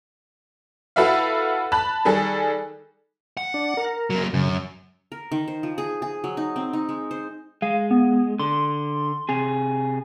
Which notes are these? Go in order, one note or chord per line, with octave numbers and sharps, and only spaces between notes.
E4 F#4 A4 B4 E5 F5
A5 B5 F#6
D#3 G3 G#4 A4
F#5
D4
A#4
F#3 A#3
F#2 C#3
A#4
D#3
C5
F3
G#4
G#4
F#3
D#4
C4
D#4
G#3
C5
G#3 F5
B3
D3 C6
C3 G#4